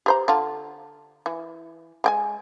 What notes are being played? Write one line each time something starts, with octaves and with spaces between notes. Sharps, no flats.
G4 C5 A#5
D3 F4
E3
G#3 G5 G#5